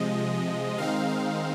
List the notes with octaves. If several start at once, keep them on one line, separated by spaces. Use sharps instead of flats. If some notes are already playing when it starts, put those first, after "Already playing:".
Already playing: C3 F3 G#3 D#5
D#3 G#3 C4 D#4 F5
F5